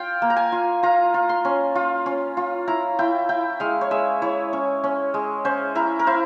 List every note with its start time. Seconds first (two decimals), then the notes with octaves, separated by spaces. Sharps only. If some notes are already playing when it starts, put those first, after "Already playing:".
Already playing: F4 F5 G5
0.22 A#3
0.30 A#5
0.37 G#5
0.52 F4
0.83 F4 A#5
1.14 F4
1.29 C6
1.45 C#4
1.75 F4
2.06 C#4
2.37 F4
2.68 E4 A#5
2.99 E4 G5
3.29 E4 G5
3.60 G#3 F5
3.81 C#5
3.91 G#3 E5
4.22 E4 C#5
4.53 C#4
4.84 C#4
5.14 G#3
5.45 C#4 C5
5.75 E4 A#4
5.99 A#4
6.07 E4 C5